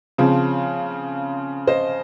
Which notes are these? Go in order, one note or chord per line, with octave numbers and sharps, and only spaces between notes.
C#3 F3 C4
C5 D#5